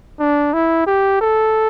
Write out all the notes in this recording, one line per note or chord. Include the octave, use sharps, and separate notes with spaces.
D4
E4
G4
A4